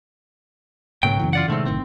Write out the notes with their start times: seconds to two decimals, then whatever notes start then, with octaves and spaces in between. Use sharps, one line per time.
1.03 B1 G#2 C#3 F#3 A#3 G5
1.19 F#2 C#3 E3
1.33 F4 D5 F#5
1.48 A2 C3 D#3 G#3 A3 C4
1.66 F#1 A2 D#3 C4